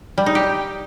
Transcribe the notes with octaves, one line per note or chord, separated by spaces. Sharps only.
G3
D#4
G4